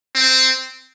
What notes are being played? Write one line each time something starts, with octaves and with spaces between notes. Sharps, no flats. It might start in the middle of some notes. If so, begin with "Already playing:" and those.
C4